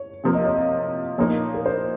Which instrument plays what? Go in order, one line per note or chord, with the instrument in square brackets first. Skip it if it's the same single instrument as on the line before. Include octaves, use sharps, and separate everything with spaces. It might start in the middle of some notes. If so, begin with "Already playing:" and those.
Already playing: [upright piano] C#5
[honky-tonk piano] C3 F3 A#3
[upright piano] D#5
C#5
D#5
[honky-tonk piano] A#2 F3 A#3 D#4 [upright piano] C#5
[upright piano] A#4
C5